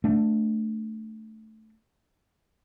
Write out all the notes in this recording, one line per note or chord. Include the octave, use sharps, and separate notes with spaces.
A3 D4